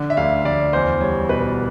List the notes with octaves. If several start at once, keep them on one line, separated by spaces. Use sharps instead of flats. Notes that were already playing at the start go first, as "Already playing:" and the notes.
Already playing: D3
E5
D2 F5
D2 D5
E2 C5
G3 C#5
B2 B4